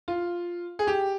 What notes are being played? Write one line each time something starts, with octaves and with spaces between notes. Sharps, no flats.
F4
G#4
G4